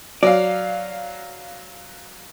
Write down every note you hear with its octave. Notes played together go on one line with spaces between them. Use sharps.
F#3 D5 F5